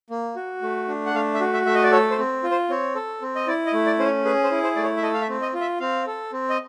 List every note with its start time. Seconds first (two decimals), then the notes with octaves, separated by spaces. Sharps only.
0.10 A#3
0.36 F#4
0.62 A3
0.88 D4
1.06 F#5
1.14 A3 F5
1.34 E5
1.41 F#4
1.53 E5
1.66 A3 E5
1.75 D#5
1.83 D5
1.92 A4 C#5
2.11 C5
2.18 C4
2.43 F4
2.51 C5
2.70 C4 C#5
2.95 A4
3.22 C4
3.36 D#5
3.47 E4 D5
3.66 D#5
3.73 A3
3.86 D5
3.99 C#4 C5
4.05 C#5
4.25 G#4 B4
4.44 C5
4.51 E4
4.63 C5
4.76 A3 D5
4.83 C#5
4.97 E5
5.03 A4 D#5
5.14 F5
5.22 E5
5.29 C4
5.42 D#5
5.54 F4
5.61 E5
5.80 C4 F5
6.07 A4
6.32 C4
6.50 D#5